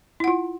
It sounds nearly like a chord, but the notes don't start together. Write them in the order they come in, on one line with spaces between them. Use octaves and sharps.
E4 F#5 F4